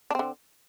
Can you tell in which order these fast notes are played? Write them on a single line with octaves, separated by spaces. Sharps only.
D4 C4 D3